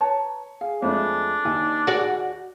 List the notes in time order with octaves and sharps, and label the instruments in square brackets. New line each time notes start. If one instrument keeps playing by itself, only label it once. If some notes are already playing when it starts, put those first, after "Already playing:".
[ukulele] B4 A5 A#5 [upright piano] C#5
[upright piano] G#4 [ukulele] F5
[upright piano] F2 G#3 A3 [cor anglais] D4
[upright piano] D#2 [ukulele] D#4 D5 G#5
[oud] F#4 D5 [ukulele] G#4